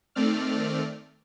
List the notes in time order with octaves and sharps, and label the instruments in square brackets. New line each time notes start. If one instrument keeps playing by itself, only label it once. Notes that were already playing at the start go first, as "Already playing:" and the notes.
[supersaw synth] D#3 A3 C4 D5 F6